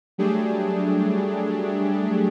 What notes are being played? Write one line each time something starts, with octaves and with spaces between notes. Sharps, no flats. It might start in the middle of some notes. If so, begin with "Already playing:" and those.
F#3 G3 A3 D4 G4 G#4